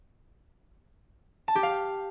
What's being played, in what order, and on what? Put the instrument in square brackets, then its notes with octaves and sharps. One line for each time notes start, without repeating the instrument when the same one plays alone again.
[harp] A5
G4
F5